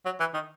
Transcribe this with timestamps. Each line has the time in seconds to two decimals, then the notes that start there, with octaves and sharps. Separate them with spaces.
0.05 F#3
0.20 E3
0.34 D#3